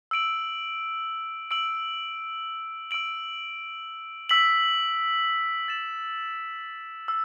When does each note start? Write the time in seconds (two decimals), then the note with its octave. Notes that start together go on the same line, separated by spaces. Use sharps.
0.11 E6 D7 F#7
1.51 E6 D7 F#7
2.91 E6 D7 F#7
4.29 E6 B6 F#7
5.68 A6 E7
7.08 E6